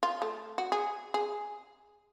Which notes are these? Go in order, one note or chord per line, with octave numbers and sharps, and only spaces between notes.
F4
A3
F#4
G#4
G#4